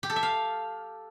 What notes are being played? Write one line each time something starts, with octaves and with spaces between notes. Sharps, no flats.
G4
A4
E5
F5